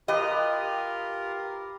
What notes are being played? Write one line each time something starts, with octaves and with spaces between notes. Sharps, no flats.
F4 G4 A#4 B4 D#5 D#6